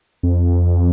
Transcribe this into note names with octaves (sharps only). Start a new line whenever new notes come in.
F2